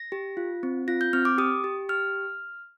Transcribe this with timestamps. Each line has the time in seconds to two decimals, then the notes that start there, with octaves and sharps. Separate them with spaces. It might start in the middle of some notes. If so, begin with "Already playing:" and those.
Already playing: A#6
0.12 G4
0.37 F4
0.63 C4
0.88 F4 A#6
1.01 G6
1.13 C4 F6
1.25 D6
1.38 G4 D#6
1.64 G4
1.89 G4 F6